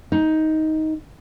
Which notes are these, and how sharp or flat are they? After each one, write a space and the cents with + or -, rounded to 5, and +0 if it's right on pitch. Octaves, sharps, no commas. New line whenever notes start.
D#4 +10